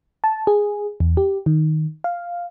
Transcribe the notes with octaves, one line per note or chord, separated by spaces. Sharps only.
A5
G#4
E2
G4
D#3
F5